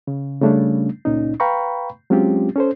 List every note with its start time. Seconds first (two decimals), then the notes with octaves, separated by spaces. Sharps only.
0.07 C#3
0.41 C#3 G3 A3 C#4 D4
1.05 C#2 A#2 C#4 D#4
1.40 B4 F5 G5 A#5 B5 C#6
2.10 F#3 G#3 C4 C#4 F4 G4
2.56 C#4 A4 C5